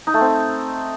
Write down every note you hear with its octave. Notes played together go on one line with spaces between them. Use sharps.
D#4
A3
C4